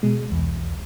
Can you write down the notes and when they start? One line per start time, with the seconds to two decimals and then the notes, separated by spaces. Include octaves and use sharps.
0.03 B2 G#3
0.30 B1 E2